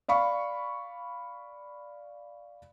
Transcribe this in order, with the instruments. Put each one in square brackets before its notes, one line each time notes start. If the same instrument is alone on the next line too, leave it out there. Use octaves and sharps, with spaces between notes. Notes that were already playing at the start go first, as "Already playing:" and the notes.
[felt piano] D5 F5 B5 C#6